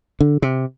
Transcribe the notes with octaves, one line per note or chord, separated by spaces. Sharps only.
D3
C3